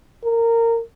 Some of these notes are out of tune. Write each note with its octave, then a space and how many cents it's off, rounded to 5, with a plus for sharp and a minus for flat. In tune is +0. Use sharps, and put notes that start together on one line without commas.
A#4 -20